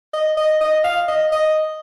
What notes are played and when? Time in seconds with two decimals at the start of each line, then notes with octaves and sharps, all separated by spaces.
0.14 D#5
0.37 D#5
0.61 D#5
0.84 F5
1.08 D#5
1.32 D#5